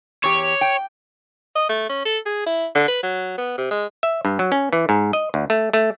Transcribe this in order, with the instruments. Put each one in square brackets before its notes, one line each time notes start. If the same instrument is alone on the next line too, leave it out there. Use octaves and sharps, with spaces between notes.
[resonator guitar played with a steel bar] E2 G4 [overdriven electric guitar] C#5
[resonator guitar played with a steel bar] G5
[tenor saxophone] D#5
A3
C#4
A4
G#4
E4
D3
B4
F#3
B3
C3
G#3
[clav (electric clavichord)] E5
G2
F#3
C#4
E3
G#2
D#5
D2
A3
A3